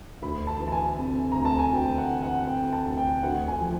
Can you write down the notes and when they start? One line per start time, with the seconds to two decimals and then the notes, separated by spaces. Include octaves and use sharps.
0.22 D2 B5
0.47 A5
0.60 E3
0.68 A5
0.72 G#5
0.98 C3
1.32 D2 A#5
1.45 A5
1.59 G#5
1.73 D2 G5
1.98 F#5
2.10 E3
2.23 F#5
2.47 C3 G5
2.73 A5
2.86 D2
2.97 G5
3.23 D2 F#5
3.48 G#5
3.61 F3